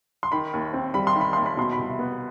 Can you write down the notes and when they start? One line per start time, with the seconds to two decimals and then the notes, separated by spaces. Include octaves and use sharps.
0.23 C6
0.32 D#3 B5
0.53 D#2
0.73 C4
0.94 G3 B5
1.07 C6
1.15 D#3
1.21 B5
1.33 D#2 C6
1.46 B5
1.57 B2 C6
1.73 B5
1.79 C2
1.99 B3